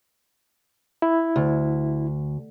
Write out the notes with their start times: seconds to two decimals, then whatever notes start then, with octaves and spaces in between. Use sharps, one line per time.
1.02 E4
1.36 D2